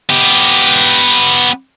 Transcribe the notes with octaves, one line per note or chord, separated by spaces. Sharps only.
B3 G4